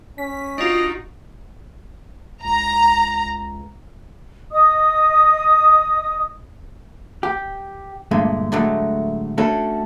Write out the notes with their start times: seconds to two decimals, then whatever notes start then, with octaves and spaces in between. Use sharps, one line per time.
0.18 C#4 B6
0.58 D4 D#4 F4 F#4 D#5
2.44 C#2 A#5
4.51 D#5 D#6
7.23 G4
8.11 G2 A#2 D3 G#3 A3
8.52 A2 D3 F#3 G#3 A3
9.38 A3 C#4 D4 F#4 A4